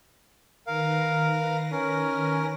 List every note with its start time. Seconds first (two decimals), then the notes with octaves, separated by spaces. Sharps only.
0.67 D#3 A#4 B4 F5 A#6
1.72 C#4 A#4